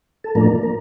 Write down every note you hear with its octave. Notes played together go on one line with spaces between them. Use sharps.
A4
A2 F3 A#3 D4 A#4
A#4